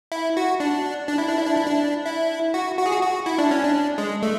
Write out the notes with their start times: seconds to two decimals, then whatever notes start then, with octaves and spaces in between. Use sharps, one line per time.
0.12 E4
0.37 F#4
0.60 D4
1.08 D4
1.18 E4
1.28 D4
1.38 E4
1.46 D4
1.57 E4
1.67 D4
2.06 E4
2.54 F#4
2.78 F#4
2.86 G#4
2.92 F#4
3.03 F#4
3.26 E4
3.38 D4
3.51 C#4
3.64 D4
3.98 G#3
4.22 A3